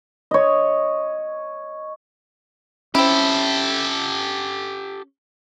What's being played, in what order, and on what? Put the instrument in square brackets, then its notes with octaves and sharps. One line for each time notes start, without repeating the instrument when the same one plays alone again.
[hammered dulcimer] C#5 D#5
[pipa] C4 E4 [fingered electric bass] C#4 [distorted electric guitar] G4 A4